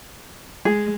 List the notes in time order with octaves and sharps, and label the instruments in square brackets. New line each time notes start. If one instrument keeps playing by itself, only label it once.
[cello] G#3 [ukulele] G#4